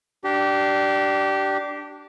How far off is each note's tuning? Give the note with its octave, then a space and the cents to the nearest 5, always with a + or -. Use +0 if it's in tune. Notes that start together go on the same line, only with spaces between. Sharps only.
D4 +0 G4 -20